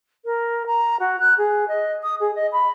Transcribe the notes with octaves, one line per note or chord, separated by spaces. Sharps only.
A#4
A#5
F#4
F#6
G#4
D#5
D#6
G#4
D#5
B5